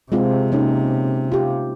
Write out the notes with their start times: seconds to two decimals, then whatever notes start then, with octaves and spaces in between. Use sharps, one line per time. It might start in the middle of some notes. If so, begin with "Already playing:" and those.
0.12 C3 G#3 C4 F4
0.52 A#3 C#4 D#4
1.32 F4 G4